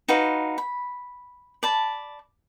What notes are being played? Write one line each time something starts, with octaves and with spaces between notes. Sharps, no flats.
D#4 F#4 B4 F5
B5
D5 A5 B5